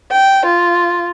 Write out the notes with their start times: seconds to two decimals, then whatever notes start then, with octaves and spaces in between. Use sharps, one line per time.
0.11 G5
0.45 F4